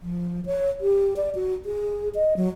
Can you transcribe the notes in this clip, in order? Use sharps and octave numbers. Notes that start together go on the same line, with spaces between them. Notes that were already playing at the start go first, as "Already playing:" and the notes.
F3
C#5
G4
D5
F#4
G#4
D#5
F#3